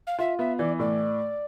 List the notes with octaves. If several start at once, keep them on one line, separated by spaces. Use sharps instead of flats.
F5
F4 E5
B3 E5
E3 D5
A2 D5